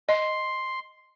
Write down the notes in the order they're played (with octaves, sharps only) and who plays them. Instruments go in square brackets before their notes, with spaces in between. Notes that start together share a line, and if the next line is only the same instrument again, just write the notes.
[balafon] D#5 [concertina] C6